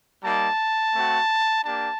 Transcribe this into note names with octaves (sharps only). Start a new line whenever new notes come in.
G3 A#3 D#4 A5
A3 C4 F#4
A#3 D4 G4 A5